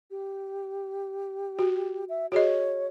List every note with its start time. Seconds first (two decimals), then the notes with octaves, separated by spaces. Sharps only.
0.11 G4
1.59 F#4
2.09 E5
2.32 F#4 G#4 C#5 D#5